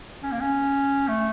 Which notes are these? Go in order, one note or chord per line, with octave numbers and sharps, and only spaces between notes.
C#4
A#3
C#4
A3